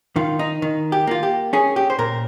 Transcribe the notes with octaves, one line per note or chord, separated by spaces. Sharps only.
D#3 F4
D#4
D#3
G4
A#3 F4
G4
C#4 G#4
G4
C5
A#2 A#4